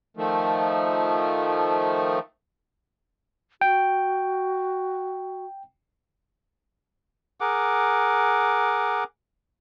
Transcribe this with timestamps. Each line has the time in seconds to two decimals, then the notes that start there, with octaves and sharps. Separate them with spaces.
0.17 D#3 F3 A3
3.61 F#4 G5
7.41 G#4 A#4 F#5 D6